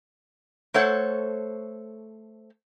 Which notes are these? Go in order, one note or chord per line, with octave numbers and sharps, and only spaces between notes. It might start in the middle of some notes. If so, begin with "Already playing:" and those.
A3 A4 C5 C#5 F#5